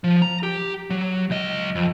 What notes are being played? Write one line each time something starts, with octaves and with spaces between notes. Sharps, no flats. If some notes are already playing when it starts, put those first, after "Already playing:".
F3
A#5
G4
F#3
C#2 D#5
F2